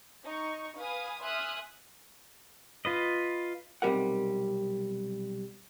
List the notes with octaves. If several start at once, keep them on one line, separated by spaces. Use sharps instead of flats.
D#4 C#6
B4 F5 G#5 D#6
E5 G#5 C6 D#6 F6 F#6
F4 B4 D#5
B1 C3 E3 G3 A#4 F#5